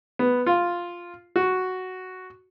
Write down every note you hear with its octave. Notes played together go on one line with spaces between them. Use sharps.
B3
F4
F#4